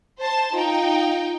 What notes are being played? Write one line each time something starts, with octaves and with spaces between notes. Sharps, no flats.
C5 A5
D#4 F4 G5